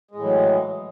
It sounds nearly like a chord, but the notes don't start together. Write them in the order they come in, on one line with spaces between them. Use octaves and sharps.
G#3 A2 E3 F#3